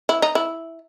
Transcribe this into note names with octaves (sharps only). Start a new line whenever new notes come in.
E4
D#4
E4